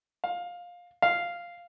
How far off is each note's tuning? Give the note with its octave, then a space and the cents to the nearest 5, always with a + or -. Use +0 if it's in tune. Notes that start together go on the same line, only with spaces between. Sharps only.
F5 +15
F5 -5